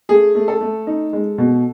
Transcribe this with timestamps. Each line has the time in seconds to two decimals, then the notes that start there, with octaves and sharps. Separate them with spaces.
0.09 A3 G#4
0.35 A3
0.48 A4
0.61 A3
0.87 D#4
1.13 G#3
1.38 B2